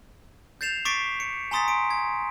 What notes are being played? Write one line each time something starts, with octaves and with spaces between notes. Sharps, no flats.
G6 A6 C7 E7 F7
C#6 D6 A6 B6 C7 D7
C#7
G#5 A#5 C6 D#6 A6 B6
D7
G#6